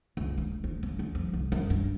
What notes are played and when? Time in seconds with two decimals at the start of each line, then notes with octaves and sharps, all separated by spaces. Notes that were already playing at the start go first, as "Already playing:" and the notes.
0.17 C#2
0.38 D2
0.64 D2
0.83 C#3
0.99 D2
1.15 F2
1.33 C2
1.52 F#2
1.70 G2